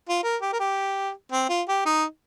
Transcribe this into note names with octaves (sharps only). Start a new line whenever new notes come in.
F4
A#4
G4
A#4
G4
C4
F4
G4
D#4